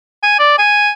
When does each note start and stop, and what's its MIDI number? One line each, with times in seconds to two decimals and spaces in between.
0.23 0.34 80
0.39 0.55 74
0.58 0.90 80